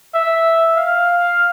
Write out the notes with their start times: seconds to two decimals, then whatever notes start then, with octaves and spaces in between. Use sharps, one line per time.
0.14 E5
0.77 F5